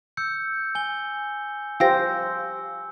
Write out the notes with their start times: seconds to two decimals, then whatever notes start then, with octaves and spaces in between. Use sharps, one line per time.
0.17 E6 G6 C#7
0.75 G#5 G7
1.80 F4 G4 C5 F5 G5 E6 A#6